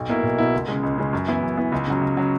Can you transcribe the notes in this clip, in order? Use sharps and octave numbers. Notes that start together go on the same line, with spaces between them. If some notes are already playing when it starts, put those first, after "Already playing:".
Already playing: B1
B2 A#3 E4
B1
B2 A#3 E4
C#2
C#3 G#3
C#2
C#3 G#3
F#2
E3 B3 E4
F#2
E3 B3 E4
C#2
C#3 F#3
C#2
C#3 F#3